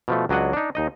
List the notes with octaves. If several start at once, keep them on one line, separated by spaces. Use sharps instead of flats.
B2 F3 A3
C#2 F#3 D4 D#5 F#5
D4 D#4
D#2 D#4 D#5